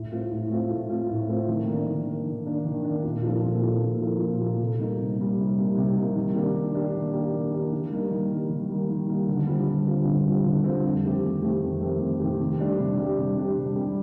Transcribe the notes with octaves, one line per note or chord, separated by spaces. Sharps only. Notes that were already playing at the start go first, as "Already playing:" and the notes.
Already playing: A2
A3 C4 F4
A2
A3 C4 F4
A2
A3 C4 F4
A2
A3 C4 F4
D#3
A#3 D4
D#3
A#3 D4
D#3
A#3 D4
D#3
A#3 D4
A#2
F3 A#3 F4 A4
A#2
F3 A#3 F4 A4
A#2
F3 A#3 F4 A4
A#2
F3 A#3 F4 A4
C3
G3 A#3 D#4
C3
G3 A#3 D#4
C3
G3 A#3 D#4
C3
G3 A#3 D#4
D#3
A#3 D4 G4
D#3
A#3 D4 G4
D#3
A#3 D4 G4
D#3
A#3 D4 G4
D#3
G3 A#3 D#4
D#3
G3 A#3 D#4
D#3
G3 A#3 D#4
D#3
G3 A#3 D#4
D3
G3 C4 F4
D3
G3 C4 F4
D3
G3 C4 F4
D3
G3 C4 F4
F2
D#3 A3 C4 G4
F2
D#3 A3 C4 G4
F2
D#3 A3 C4 G4
F2
D#3 A3 C4 G4
C3
G3 D4 G4
C3
G3 D4 G4
C3
G3 D4 G4
C3
G3 D4 G4